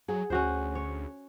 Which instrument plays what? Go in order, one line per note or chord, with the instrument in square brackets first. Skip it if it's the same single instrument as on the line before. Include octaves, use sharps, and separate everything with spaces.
[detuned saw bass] F#3 [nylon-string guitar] G#4 F#5
[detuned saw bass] D2 [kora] C#4 F#4 C5
[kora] C#5